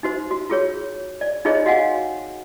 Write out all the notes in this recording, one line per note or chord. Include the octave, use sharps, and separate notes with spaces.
D#4 F#4 C5
F#4
F4 G#4 C#5
D5
D#4 F4 G#4 C5 C#5 D#5
F#4 D#5 F5 F#5 G#5